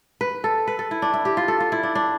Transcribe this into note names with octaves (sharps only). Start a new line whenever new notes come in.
B4
A4
B4
A4
E4
D4
E4
G4
F4
A4
F4
E4
D4
D4